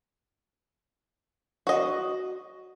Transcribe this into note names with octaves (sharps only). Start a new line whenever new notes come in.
F#4 D#5